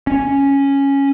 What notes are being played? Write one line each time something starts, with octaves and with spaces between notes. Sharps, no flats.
C#4